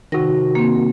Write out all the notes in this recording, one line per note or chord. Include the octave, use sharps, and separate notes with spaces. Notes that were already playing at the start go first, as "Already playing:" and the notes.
C3 D#3 F#4 A#4 A#6
A#3 C4